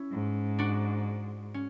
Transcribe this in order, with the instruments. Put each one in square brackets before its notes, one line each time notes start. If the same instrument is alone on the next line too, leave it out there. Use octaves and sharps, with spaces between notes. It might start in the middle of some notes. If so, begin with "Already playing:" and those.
Already playing: [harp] C#4 E4
[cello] G#2
[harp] D4 F#4
C#4